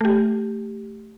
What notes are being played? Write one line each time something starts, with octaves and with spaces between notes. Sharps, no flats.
A3 G4